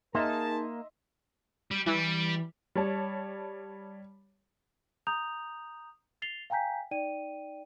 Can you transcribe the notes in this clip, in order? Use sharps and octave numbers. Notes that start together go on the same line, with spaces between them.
A#3 D#4 G#4 A#4 D#5 E5 A5 C6
G3
E3 G3
G3 C#5 A5
A#5 D#6 G6 F7
A6 C7 F7 G7
F5 G5 G#5 A#5 G6 B6
D#4 D5 G5 D#7